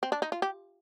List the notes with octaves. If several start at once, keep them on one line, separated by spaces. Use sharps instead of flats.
C4
D4
D#4
F4
G4